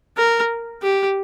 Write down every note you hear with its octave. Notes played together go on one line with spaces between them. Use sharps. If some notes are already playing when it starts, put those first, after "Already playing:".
A#4
G4